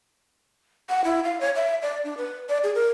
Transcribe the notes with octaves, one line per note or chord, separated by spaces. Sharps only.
F#5
E4
F5
C#5
E5
D5
D4
B4
D5
G#4
A#4